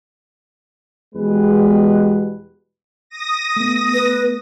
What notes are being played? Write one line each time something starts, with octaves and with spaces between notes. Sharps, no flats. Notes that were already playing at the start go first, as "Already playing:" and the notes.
E2 B2 G3 G#3 B4
D#6 A#6
A3 B3
B4